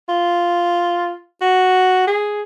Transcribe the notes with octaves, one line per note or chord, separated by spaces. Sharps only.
F4
F#4
G#4